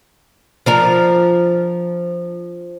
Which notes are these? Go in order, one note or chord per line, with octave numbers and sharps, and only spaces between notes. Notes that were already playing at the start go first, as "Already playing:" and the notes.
F3 D4 A#4